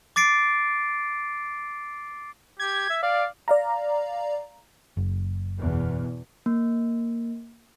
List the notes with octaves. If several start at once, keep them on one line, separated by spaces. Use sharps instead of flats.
D6 A6 C7 D7
G4 G#6
E5
D5 F5
D5 F5 A#5
F#1
E2 B2
A#3